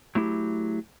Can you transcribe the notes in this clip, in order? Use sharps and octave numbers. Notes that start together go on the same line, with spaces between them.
F#3 A3 E4 G4